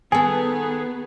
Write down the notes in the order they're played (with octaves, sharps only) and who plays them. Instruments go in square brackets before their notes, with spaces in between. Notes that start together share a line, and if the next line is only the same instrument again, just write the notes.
[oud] D#3 A4 [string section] B3 [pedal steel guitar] G#4 [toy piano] G#5